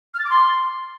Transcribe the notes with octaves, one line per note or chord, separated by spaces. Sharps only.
F6
A6
D6
C6